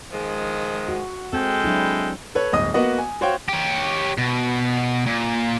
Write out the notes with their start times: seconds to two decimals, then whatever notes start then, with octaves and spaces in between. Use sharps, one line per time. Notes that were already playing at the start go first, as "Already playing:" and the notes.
0.13 D#3 F3 G#3
0.88 F#4
1.33 G#3 C4 A4 G5
1.64 F#3 D4 E4
2.35 A4 B4 C#5
2.53 D1 G1 D#5 D#6
2.74 A#3 B3 F#4 D#5
2.98 G#5
3.21 F#4 C5 C#5 F5 G5
3.49 G4 C#5
4.18 B2
5.07 A#2